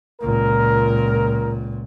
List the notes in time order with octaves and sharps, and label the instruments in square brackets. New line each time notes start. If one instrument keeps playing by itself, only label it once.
[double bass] C#2 A#2 [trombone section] A#4